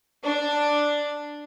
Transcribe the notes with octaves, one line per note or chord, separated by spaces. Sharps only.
D4